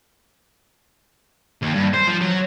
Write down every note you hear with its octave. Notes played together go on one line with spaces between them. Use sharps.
D#2
G2
C5
F3
F#3